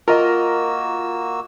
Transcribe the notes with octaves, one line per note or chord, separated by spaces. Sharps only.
A#3 F4 F#4 A#4 D#5 E6